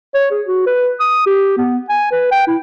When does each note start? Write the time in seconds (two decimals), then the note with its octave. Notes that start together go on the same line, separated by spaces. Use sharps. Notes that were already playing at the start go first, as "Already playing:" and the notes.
0.14 C#5
0.31 G#4
0.47 F#4
0.66 B4
1.00 D#6
1.26 G4
1.57 B3
1.89 G#5
2.12 B4
2.31 G5
2.47 E4